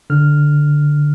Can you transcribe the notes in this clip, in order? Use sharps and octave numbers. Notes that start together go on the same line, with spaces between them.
D3 F6